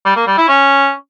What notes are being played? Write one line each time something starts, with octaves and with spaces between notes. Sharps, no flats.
G3
A#3
G3
E4
C#4